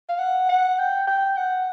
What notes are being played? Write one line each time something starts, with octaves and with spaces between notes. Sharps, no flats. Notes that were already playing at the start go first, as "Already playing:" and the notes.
F5
F#5
F#5
G5
G5
F#5